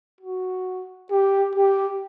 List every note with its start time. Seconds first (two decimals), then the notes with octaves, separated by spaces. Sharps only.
0.21 F#4
1.11 G4
1.56 G4